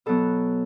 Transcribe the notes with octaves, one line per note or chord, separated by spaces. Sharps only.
B2 F#3 B3 A4